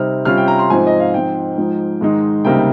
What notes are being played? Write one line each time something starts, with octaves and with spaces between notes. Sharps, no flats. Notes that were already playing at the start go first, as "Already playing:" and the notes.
Already playing: C3 G3 C4 D#4 F6
C3 G3 C#4 F4 F6
G5
A#5
C6
G#2 F3 C4 G#5
D#5
F5
G#2 F3 C4 D#4 G5
G#2 F3 G#3 D#4
G#2 D#3 G#3 D#4
C#2 C3 G3 A#3 D#4 G5